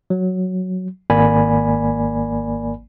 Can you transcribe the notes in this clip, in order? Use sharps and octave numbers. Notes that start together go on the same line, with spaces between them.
F#3
G#1 A#3 D5 G#5 B5